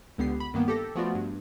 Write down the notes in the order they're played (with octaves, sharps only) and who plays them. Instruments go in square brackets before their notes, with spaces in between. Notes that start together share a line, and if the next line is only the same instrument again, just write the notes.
[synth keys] C#2 D3 B3 G4 C7
B5
G2 D#3 A#3 B3
G4 A4 A#6
F3 A3 B3 F4 F#4 D5
G2